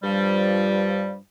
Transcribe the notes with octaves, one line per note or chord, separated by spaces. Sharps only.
G2 F3 G3